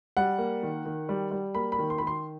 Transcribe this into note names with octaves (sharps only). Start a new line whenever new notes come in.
G3 F#5
A#3
D#3
D#3
G3
G3
A#3 B5
B5
D#3
C6
B5
D#3
C6